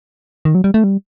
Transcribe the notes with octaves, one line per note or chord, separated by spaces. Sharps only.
D#3
F#3
G3
A3
G3